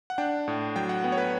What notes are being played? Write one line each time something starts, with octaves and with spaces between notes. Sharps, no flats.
F#5
D4 G5
A2
F#3 G5
F#5
B3
C#5
B4